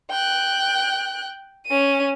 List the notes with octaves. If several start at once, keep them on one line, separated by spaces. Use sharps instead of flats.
G5 F#6
C#4 D#7